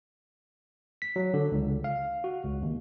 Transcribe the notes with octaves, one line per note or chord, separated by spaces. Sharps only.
B6
F#3
D3
C#2
F5
F#4
C#2
D#2